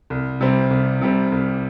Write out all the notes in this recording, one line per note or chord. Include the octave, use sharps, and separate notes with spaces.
C2
C3 G3 C4
C2
C3 G3 C4
C2